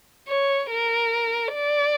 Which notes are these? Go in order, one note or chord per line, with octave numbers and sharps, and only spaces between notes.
C#5
A#4
D5